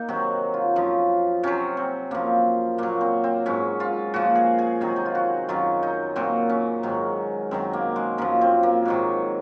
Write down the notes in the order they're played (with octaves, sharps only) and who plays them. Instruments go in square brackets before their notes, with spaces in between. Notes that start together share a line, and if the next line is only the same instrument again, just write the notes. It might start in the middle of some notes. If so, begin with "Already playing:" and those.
Already playing: [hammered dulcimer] A#3 D#4
C3 D#3 F#3 F#4
F4
F#2 F3
C3 F#3 C#4
C4
F#2 F3 A#3
A#2 F#3 A#3
C4
C4
G#2 F#3 C#4
F4
A#2 F3 F#4
G#4
G#4
C3 D#3 F#3 G#4
D#4
F4
F#4
F#2 D#3 F#3 F4
D#4
A#2 F#3 C4
C#4
G#2 D#3 F#3
F#2 D#3 F#3 C4
A#3
G#3
F#2 F3 A#3
C4
A#3
G#2 D#3 F#3